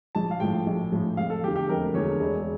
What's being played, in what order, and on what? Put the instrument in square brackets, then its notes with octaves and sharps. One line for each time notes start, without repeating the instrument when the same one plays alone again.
[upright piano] A#1 [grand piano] A5
[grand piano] F5
[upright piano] A2 F3 [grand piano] G5
[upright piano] A#1
A2 F3
[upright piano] F1 [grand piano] F5
[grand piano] A4
[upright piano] E2 [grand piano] G4
[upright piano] D3
[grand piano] G4
[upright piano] F1 [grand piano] A#4
[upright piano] E2 D3 [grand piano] C#5
[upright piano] E1